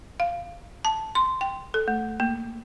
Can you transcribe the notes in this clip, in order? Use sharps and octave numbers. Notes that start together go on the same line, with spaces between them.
F5
A5
C6
G5
A4
A3
A#3